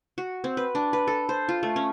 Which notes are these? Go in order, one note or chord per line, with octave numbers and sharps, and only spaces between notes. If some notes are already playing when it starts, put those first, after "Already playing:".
F#4
C4
B4
D4
B4
A4
C5
F4
A3
C#4